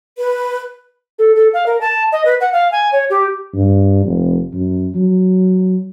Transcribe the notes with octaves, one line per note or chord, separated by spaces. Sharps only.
B4
A4
A4
F5
A#4
A5
D#5
B4
F#5
F5
G#5
C#5
G4
G2
F1
F#2
F#3